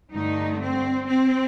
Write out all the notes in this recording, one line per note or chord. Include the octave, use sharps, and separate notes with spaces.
G2 D3 A3 D#4
C4
C4